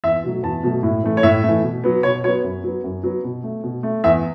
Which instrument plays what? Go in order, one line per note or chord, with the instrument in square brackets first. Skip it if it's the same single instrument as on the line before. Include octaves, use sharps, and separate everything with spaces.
[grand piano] E2 E5
B2 F#3 A3
E2 A5
B2 F#3 A3
A2
E3 A3
C#5
A2 E5
E3 A3
B2
F#3 B3
B2 C#5
F#3 C#5
B3
F#2
F#3 B3
F#2
F#3 B3
B2
A3
B2
A3
E2 E5